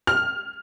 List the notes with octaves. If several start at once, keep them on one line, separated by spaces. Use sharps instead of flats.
F6